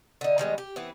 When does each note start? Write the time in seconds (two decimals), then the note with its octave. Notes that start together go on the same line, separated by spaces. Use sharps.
0.21 D3 D#4
0.38 D#3 G3 G#3 B3
0.58 G4
0.76 E3 B3 C4